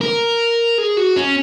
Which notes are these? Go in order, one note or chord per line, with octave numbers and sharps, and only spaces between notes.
A#4
G#4
F#4
C#4